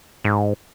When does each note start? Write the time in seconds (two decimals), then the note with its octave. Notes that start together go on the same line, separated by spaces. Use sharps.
0.25 G#2